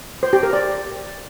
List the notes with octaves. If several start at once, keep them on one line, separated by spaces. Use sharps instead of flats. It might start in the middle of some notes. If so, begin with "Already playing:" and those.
C5
G4
A#4
D5